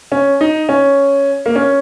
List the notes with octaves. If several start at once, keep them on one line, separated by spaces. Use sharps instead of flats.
C#4
D#4
C#4
A#3
C#4